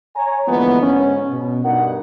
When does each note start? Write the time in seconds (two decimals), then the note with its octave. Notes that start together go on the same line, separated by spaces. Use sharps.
0.16 C#5 G#5 A#5
0.48 D3 E3 F3 G#3 A#3 B3
0.83 G#2 C#4
1.31 B2
1.65 G2 D#4 A#4 F#5